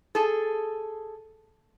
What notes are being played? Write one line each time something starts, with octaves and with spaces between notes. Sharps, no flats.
G#4 A4